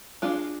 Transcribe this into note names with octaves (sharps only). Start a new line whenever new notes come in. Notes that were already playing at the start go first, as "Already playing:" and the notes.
G#3 D4 F4